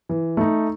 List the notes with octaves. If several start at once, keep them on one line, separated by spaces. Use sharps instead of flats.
E3
A3 D#4